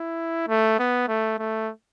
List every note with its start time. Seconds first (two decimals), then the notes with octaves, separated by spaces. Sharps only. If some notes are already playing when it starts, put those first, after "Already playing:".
Already playing: E4
0.48 A3
0.79 B3
1.08 A3
1.39 A3